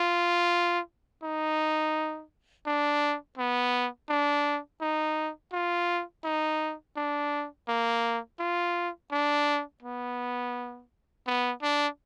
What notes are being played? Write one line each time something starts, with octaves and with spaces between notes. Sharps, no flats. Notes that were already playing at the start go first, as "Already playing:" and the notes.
Already playing: F4
D#4
D4
B3
D4
D#4
F4
D#4
D4
A#3
F4
D4
B3
B3
D4